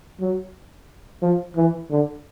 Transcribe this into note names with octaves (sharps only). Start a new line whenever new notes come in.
F#3
F3
E3
D3